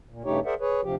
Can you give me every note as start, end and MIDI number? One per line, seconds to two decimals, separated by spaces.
0.09 0.23 46
0.25 0.40 43
0.25 0.40 49
0.25 0.40 57
0.25 0.40 63
0.25 0.40 67
0.25 0.40 73
0.45 0.54 68
0.45 0.54 70
0.45 0.54 72
0.45 0.54 74
0.45 0.54 76
0.45 0.54 78
0.60 0.81 68
0.60 0.81 71
0.60 0.81 73
0.83 0.95 38
0.83 0.95 48
0.83 0.95 53
0.83 0.95 67